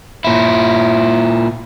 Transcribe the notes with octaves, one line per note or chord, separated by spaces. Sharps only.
A#2 E4